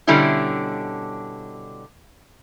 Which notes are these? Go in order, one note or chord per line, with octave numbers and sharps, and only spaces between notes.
B2 D3 G3 C#4 D4 E4